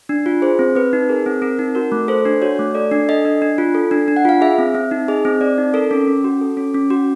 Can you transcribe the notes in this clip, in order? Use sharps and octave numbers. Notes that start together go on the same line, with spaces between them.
D4
F4
G#4 C5
C4
C4 B4
D#4
G#4 A#4
C4
C4 A#4
D#4
F#4 A#4
A3
A4 C5
D4
F#4 C#5
A3
A4 D5
D4
A4 D#5
D4
D4
F4
A4
D4
D4
F#5
F4 F5
G#4 E5
C4
C4 E5
D#4
G#4 D#5
C4
C4 D5
D#4
A4 A#4
C#4
C#4
F#4
A4
C#4
C#4
F#4